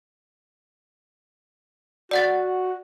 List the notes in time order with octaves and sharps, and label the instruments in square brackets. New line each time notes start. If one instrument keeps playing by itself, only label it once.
[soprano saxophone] F#4 [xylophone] D5 F#5 A6